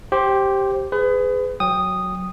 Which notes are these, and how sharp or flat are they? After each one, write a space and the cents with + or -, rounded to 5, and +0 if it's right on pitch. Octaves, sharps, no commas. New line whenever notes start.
G4 -5 C5 +15
G#4 +0 B4 +35
F#3 +0 G5 +15 D#6 -5